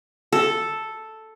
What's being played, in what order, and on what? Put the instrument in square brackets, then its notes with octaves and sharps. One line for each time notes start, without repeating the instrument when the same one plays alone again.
[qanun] A4